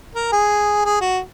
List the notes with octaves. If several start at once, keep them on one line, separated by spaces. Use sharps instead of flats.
A#4
G#4
G#4
F#4